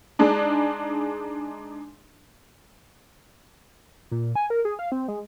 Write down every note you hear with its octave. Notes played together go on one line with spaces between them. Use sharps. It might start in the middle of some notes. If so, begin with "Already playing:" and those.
G#3 D4 D#4
A#2
G#5
A#4
G#4
F5
C4
G#3